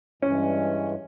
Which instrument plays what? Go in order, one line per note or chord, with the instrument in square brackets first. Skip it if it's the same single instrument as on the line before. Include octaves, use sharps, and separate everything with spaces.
[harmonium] G2 E3 G#3 [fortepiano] C#4